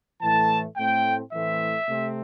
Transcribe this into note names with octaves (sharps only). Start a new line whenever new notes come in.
A2 E3 A3 A5
A2 A3 C4 G5
A2 E3 A3 C4 E5
C3 A3 C4